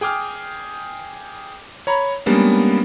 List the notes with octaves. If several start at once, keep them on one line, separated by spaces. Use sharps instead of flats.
G#4 G5 D6 F6
C#5 A#5 B5
G3 G#3 A#3 B3 C#4 D4